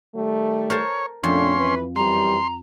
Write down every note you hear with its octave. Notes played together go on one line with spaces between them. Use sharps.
D#3 G3 A3
A#4 C5 C#5 A5
F2 A#2 A3 C#4 D4 C6
E3 B4
F#2 E3 G3 A#5 C6